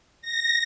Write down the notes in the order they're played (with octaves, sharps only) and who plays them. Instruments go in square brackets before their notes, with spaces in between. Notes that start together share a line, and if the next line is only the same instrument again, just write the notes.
[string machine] A#6